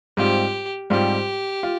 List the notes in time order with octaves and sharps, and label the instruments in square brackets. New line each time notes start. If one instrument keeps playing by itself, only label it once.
[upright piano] G#2 G3 C4 F4 [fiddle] G4
[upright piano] G#2 G3 C4 F4 [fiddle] G4
[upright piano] F4